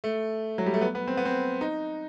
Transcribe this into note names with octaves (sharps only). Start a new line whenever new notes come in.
A3
F#3
G3
A3
B3
B3
C4
B3
C4
D#4